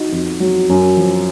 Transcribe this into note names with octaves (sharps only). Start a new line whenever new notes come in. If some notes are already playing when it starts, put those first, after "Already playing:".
Already playing: D#4 F#4
F2
F#3
F#2
F3